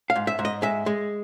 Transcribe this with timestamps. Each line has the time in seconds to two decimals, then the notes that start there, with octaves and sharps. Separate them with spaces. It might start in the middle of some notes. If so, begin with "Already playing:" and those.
0.10 F5
0.16 G#2
0.27 E5
0.39 G#2
0.45 D#5
0.62 G#3 E5
0.86 G#3